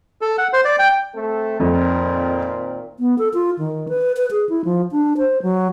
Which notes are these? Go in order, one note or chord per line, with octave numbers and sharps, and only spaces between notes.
A4
F#5
C5
D5
G5
A3 C4 A4
F2 A#2 D#3 C4
B3
A4
F4
D#3
B4
B4
G#4
E4
F3
D4
C5
F#3